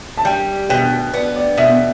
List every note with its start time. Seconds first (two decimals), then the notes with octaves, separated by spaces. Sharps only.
0.17 A5
0.25 G3 G5
0.70 B2 G5
1.14 B3 D5
1.36 D5
1.58 B2 E5